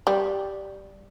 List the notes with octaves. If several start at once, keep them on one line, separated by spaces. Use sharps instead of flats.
G3